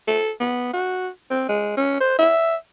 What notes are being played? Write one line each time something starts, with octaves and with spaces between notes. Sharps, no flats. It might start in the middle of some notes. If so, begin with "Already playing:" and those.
A4
B3
F#4
C4
G#3
C#4
C5
E5